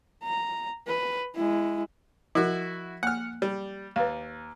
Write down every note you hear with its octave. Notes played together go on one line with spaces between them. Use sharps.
A#5
B4
G#3 E4
F3 E4 F#4 A#4
A#3 F#5 F6
G3
D#2 B4 F5